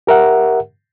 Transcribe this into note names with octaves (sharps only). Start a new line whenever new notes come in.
G4 A#4 E5 F#5